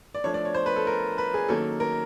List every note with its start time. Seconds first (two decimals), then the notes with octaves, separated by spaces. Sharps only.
0.15 D5
0.24 F3 A3 D4 C#5
0.34 D5
0.45 C#5
0.54 C5
0.66 B4
0.76 A4
0.87 A#4
1.18 B4
1.34 G#4
1.49 D#3 F#3 A#3 C#4 A4
1.80 A#4